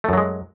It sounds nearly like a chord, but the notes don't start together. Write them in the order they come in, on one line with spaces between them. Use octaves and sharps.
A3 F#2 F#3 G#3